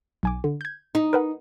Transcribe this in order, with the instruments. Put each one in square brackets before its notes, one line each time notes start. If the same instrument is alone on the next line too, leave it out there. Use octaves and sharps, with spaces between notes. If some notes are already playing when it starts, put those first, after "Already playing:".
[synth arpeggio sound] B1 G#5 D6
D3
G6 G#6
[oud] D#4
[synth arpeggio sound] A#4 B4 F#5